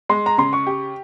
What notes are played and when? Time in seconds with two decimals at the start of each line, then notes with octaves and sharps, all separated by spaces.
0.09 G#3 C6
0.26 A#5
0.38 C#3 C6
0.53 C#6
0.67 G4